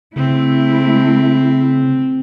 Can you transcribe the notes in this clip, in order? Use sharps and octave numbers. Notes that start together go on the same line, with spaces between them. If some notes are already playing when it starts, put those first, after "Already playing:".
C#3 A3 C4 E4